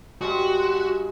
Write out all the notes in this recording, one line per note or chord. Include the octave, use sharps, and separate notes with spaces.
G2 G#3 F#4